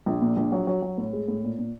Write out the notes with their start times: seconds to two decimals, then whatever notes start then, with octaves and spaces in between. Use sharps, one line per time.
0.06 A#1
0.21 A#2
0.37 A#1
0.52 F#3
0.67 F#3
0.82 F#3
0.98 A2
1.13 G#3
1.28 A2
1.44 A#2
1.59 A#2